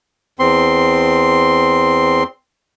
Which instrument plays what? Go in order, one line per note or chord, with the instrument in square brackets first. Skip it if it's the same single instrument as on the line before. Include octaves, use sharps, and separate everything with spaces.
[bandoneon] E2 C4 C6